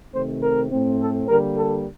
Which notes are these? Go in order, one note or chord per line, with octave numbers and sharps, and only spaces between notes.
C3 D#3 A3 C4 C5
A#4
A2 A3 C4
A4
D3 G3 A#3 A#4
A4